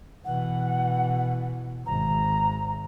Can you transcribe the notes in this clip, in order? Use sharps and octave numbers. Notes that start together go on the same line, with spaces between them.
B2 E3 F#5
G#1 A#5